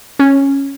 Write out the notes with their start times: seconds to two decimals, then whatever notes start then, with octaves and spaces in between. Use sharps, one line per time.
0.19 C#4